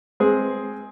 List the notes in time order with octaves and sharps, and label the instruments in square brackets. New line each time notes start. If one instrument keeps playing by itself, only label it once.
[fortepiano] G#3 C4 G#4